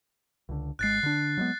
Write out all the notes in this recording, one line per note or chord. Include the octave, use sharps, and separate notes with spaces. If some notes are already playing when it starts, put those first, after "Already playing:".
C#2 D3
G#1 G#3 F#6 A6 C7
D3 D4
F#3 G#3 B3